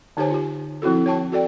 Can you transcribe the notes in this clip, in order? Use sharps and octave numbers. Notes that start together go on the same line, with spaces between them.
D3 D#4 G4 C5 C#5 G#5
F4 G4
F3 C4 E4 F#4 A4
C#5 G5 A5 C#6
F#4 A4 D5 G5